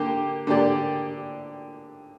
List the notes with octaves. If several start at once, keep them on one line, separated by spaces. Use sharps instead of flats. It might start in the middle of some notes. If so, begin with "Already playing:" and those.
Already playing: D3 A#3 G4
D3 A#3 G4 D5